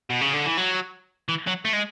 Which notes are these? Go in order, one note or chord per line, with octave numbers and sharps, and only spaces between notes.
B2
C#3
D3
E3
F#3
E3
F#3
A3
G#3